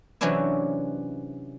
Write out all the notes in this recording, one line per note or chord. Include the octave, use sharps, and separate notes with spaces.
C3 E3 F#3 C#4 D4 E4